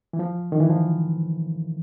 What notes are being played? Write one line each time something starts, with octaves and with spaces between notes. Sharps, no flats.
E3
F3
D#3
E3
F3